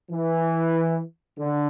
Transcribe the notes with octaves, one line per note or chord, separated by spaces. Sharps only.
E3
D3